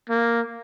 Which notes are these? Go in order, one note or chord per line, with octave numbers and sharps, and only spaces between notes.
A#3